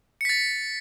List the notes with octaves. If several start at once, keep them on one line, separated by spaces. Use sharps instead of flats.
A6 B6 C#7